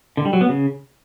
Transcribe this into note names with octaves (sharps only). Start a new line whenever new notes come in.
D3
G3
F#3
B3
C#3